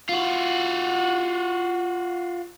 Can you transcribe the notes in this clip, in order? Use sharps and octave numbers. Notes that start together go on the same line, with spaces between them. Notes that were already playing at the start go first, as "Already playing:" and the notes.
F4 F#4